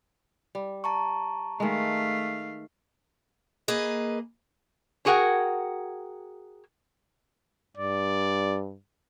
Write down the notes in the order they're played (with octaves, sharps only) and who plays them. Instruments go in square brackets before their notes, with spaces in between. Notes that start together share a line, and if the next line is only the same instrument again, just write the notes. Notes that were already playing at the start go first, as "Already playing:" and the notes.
[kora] G3
[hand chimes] A5 A#5 C#6
[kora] D#3 G#3 [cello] A3 F5
[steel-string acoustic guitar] A#3 G#4 B4 D#5
[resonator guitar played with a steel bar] D4 F#4 G#4 A#4 F#5 G5
[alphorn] G2 [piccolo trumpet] D5